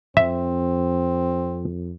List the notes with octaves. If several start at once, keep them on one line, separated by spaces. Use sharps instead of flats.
F2 C4 E5